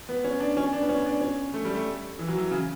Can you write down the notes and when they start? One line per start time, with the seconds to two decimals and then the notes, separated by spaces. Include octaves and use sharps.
0.09 B3
0.24 C#4
0.40 D4
0.57 C#4
0.73 D4
0.82 B3
0.89 C#4
1.06 D4
1.21 C#4
1.54 A3
1.65 G3
1.75 A3
2.19 E3
2.28 F#3
2.38 E3
2.51 C#3